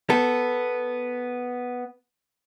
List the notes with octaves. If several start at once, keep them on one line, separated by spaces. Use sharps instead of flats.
B3 A4